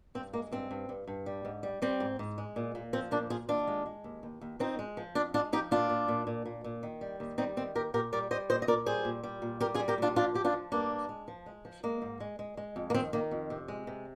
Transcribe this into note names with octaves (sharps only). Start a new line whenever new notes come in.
G2 C4
G#3 A#3
G2 C4
G2
G2
G2
G3
G#2
G3
G3 C4
G#2
G#2
G#3
A#2
A#2
F3 C4
A#2 A#3 D4
A#2 F4 G#4
D#2 D4 F4
G#3
G#3
D#2
D#2
D#2
F2 C4 D#4
G#3
F3
F2 D4 F4
G#3 D4 F4
F3 D#4 G4
A#2 D4 F4
A#2
A#2
A#2
A#2
A#2
D#3
G3
D#2
G3 C4 D#4
D#3 C4
D#2 G4 A#4
A#2 G4 A#4
G3 A#4 D5
G3 C5 D#5
A#2 C5 D#5
D#5
A#2 A#4 D5
G3 G#4 C5
A#2
G3
A#2
G3 G4 A#4
F4 G#4
G3
G4 A#4
A#2 D4 F4
F3 D4 F4
F3 G4
D4 F4
F3
G2 A#3 D4
G2
G#3
F3
G#3
F3
G#3 A#3
G#2
G#3
G#3
G#3
F2
A#3
D#3 C4
D#3 A#3
F2
C3
G#3
C3